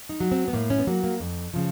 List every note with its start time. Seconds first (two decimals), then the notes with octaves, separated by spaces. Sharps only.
0.09 D#4
0.20 F#3
0.32 C4
0.48 B3
0.53 A2 A#3
0.70 C#4
0.79 B3
0.87 F#3 A#3
1.04 A#3
1.20 F2
1.53 C#3 F3